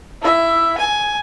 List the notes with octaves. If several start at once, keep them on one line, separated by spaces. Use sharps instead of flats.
E4 E5
G#5